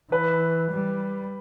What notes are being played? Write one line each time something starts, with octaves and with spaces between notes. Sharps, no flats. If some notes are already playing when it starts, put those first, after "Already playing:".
E3 B4
G3